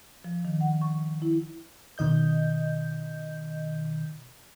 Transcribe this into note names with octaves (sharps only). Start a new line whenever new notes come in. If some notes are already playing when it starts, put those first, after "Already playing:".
F3
D#3
F#5
C#6
E4
B2 D#3 D#5 G6